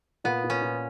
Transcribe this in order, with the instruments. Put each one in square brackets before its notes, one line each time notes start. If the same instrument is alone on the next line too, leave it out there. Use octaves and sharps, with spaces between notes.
[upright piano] A#2 [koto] B3
[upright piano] A#2
[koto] C#4
[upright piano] A#2